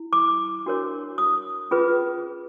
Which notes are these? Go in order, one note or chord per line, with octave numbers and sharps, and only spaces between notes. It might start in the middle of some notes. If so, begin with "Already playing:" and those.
Already playing: E4
D6
D4 F#4 A#4 C#5
D#6
C#4 F4 G#4 B4